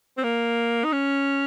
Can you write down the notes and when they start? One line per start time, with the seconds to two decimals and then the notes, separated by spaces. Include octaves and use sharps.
0.18 C4
0.24 A#3
0.85 D#4
0.93 C#4